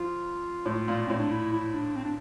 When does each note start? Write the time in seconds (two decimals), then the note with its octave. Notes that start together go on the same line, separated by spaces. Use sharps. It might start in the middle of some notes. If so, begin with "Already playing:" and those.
Already playing: F2 F4
0.66 A2
0.88 A#2
1.07 A2 C4
1.19 D4
1.31 E4
1.53 E4
1.74 D4
1.96 C4
2.04 D4